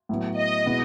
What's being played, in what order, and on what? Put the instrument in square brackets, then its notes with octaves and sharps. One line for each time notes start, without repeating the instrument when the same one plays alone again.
[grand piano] A2 F#3 B3
[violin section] D#5
[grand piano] B2 G#3 B3 E4